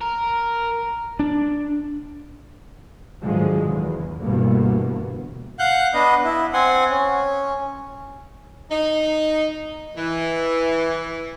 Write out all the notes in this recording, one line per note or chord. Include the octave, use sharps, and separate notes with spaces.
A#4
D4
G#2 D3 D#3 F3 F#3 G#3
E2
D2 G2 B2 E3 A#3 B3
F5 F#5 F#6 G6
B3 D4 D#5
E4
C4 F#5 G#5 C6
C#4
D#4
E3